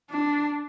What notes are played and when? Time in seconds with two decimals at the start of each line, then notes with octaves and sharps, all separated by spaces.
0.11 D4